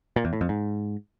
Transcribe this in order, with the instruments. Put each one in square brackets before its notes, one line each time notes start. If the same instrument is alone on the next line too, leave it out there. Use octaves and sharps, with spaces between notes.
[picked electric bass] A#2
E2
A2
F2
G#2